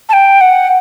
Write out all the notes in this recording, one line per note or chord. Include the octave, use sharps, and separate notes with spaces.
A5
G5
F#5